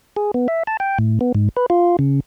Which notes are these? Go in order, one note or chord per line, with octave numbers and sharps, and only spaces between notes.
G#4
B3
E5
A5
G5
A2
B3
G#2
B4
F4
C#3